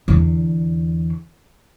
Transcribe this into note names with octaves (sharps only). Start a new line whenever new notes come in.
E2 D3